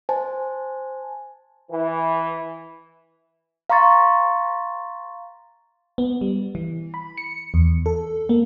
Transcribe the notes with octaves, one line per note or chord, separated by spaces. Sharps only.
C5 G#5 A5
E3
F5 A#5 C6 C#6 A6
B3
G3
E3
B5
C#7
E2
A4
A#3